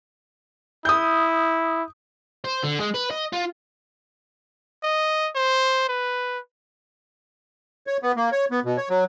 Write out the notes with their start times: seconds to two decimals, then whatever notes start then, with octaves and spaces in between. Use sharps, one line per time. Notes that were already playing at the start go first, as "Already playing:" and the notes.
0.85 E4 D#6 G6
2.44 C5
2.63 D3
2.80 G#3
2.94 B4
3.11 D#5
3.33 F4
4.84 D#5
5.35 C5
5.89 B4
7.87 C#5
8.03 B3
8.16 A#3
8.32 C#5
8.51 B3
8.65 B2
8.77 C#5
8.90 F#3